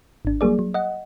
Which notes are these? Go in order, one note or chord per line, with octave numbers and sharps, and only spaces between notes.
G#1 D4
F#3 G3 A#3 G#4 D5
F#3
D#5 F#5